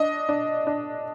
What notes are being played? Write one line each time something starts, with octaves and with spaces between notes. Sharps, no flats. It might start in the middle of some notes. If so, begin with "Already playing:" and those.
Already playing: D4 D#5
D4
D4